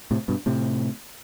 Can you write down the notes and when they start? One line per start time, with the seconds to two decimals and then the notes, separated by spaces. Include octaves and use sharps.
0.11 A2 C3
0.28 G2 B2
0.46 A2 C3